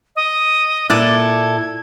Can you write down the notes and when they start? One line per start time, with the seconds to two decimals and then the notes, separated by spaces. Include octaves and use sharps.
0.16 D#5
0.90 A#2 E4 A4 D5 F#6 G#6